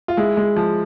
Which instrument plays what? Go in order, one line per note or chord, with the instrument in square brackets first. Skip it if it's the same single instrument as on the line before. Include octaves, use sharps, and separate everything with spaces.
[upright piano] F4
G#3 E4
G#3
F3